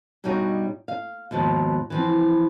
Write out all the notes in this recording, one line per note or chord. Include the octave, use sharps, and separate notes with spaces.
G2 B2 G3 D#4 F#4 C#5
F5
D#2 G#2 B2 F3
E3 F3 C4